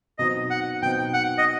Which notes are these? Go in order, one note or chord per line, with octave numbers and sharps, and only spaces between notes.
B2 F#3 C4 D#4 D#5
F#5
B2 F#3 C4 D#4 G5
F#5
D#5